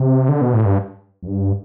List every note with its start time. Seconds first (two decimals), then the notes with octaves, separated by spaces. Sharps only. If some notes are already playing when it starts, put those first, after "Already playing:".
Already playing: C3
0.29 D3
0.41 B2
0.54 A2
0.65 G2
1.23 F2
1.27 G2